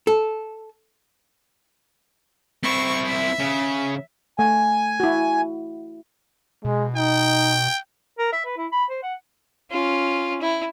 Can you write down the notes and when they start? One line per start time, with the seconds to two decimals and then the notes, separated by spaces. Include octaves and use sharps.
0.07 A4
2.64 C4 E4 C#6
3.07 E5
3.39 C#3
4.39 A3 G#5
5.00 E4 F#4
6.65 B2 G#3
6.96 D#4 G5
8.19 A#4
8.33 E5
8.45 B4
8.57 E4
8.72 B5
8.90 C5
9.03 F#5
9.72 C#4 F4
10.41 E4